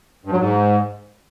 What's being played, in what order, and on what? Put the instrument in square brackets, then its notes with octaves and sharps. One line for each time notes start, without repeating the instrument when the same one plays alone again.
[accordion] G2
F#3
G#2